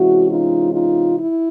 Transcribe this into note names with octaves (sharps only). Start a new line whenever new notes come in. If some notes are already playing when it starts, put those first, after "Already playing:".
Already playing: C3 E3 G#3 C#4 E4 F#4
D#4 F4
D#4 F4
E4